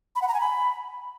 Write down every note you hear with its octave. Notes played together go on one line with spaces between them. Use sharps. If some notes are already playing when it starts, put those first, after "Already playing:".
B5
F#5
A#5
G#5
B5